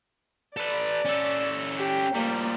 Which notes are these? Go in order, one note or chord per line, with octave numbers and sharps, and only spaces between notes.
A4 B4 D5
C#4 A4
G4
F3 G3 A#3